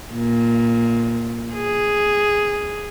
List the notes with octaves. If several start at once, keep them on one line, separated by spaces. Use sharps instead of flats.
A#2
G#4